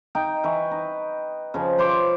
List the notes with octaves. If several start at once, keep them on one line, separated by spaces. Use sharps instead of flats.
D#4 G5
E3 B4 C#6
D#4
C#3 F3
B4 C5 C6 D6